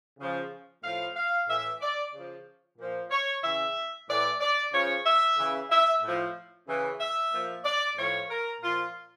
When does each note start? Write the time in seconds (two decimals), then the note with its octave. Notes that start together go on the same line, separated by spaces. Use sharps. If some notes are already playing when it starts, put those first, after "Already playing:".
0.18 C#3 F3
0.82 A2 F3 F5
1.16 F5
1.47 A2 E3 E5
1.80 D5
2.13 C#3 F3
2.78 A#2 F3
3.10 C#5
3.43 C#3 E3 E5
4.08 A2 E3 D5
4.40 D5
4.72 C#3 F3 C#5
5.05 E5
5.37 C#3 E3
5.70 E5
6.03 A2 F3
6.67 C#3 E3
6.99 E5
7.32 A#2 F3
7.65 D5
7.97 A2 F3 C#5
8.29 A#4
8.61 A#2 F3 F4